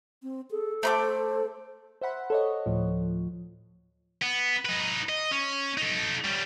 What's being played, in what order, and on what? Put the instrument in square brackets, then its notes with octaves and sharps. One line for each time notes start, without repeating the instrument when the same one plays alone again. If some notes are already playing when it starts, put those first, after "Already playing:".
[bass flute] C4
[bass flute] G#4 [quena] A4
[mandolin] A3 A#5 D6 [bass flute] C5
[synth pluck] C5 E5 F#5 B5
A4 C#5 D#5
D2 A2 F3
[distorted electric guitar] B3
D#4 B4
D#5
C#4
D#4 A4
G3 C#4